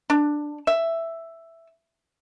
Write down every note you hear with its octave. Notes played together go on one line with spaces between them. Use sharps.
D4
E5